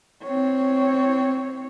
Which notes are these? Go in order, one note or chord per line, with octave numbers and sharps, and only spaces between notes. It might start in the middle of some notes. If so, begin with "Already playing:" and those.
C4 C#5